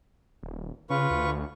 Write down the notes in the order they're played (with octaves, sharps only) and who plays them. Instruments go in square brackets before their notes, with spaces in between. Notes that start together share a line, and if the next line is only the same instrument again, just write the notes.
[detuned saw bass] D#1
[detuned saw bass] C#3 [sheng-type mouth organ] F4 B4 C#6
[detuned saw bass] D2